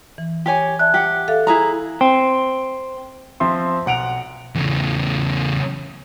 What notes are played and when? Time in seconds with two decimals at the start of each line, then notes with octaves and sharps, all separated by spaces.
0.18 E3
0.46 G4 C#5 G#5
0.79 D5 E5 A5 F#6
0.94 G4 F#5
1.28 A4 E5 F5
1.47 E4 G#4 A#5
2.01 C4
3.40 F3 C4 E5 C6
3.86 B1 F#5 D7 F7
4.55 E2 C#3